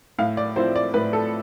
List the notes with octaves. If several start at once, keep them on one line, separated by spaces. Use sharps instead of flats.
A2 F5
D5
F3 C4 E4 C5
D5
A2 B4
A4